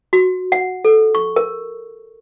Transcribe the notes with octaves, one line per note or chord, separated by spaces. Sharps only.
F#4
F#5
A4
C#6
A#4